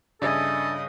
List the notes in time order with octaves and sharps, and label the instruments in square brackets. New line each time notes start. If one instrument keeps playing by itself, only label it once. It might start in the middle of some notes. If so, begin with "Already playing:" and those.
[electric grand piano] G2 C#3 [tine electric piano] D4 E5 G#5 [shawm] A4 [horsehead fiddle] D#5